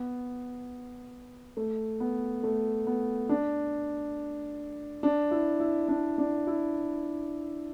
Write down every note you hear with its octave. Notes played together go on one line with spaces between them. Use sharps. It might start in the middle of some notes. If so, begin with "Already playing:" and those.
Already playing: B3
A3
B3
A3
B3
D4
D4
E4
E4
D4
D4
E4